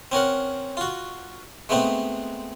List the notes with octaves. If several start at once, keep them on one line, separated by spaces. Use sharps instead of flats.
C4 C#4 A#4 F#5
F4 F#4
G#3 A3 B3 C4 D#4